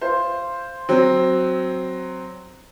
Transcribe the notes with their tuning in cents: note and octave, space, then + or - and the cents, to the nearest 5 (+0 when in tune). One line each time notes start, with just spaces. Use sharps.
F4 -20 C5 +0
F#3 +0 C4 +0